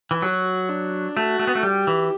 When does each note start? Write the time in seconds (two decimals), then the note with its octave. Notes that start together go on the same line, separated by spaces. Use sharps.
0.11 E3
0.22 F#3 F#4
0.69 D4
1.16 A3 F#4
1.39 A3
1.47 B3
1.55 A3
1.63 G3 G4
1.87 E3